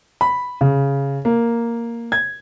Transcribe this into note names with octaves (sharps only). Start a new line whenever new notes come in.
B5
C#3
A#3
G#6